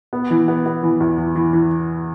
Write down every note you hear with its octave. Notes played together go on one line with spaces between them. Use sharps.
B3
E3
B3
B3
E3
E2
E3
E3
E3